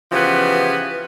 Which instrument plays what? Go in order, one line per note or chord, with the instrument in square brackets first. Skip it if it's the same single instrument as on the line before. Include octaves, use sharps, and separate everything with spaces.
[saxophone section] C#3 E3 F3 B3 G4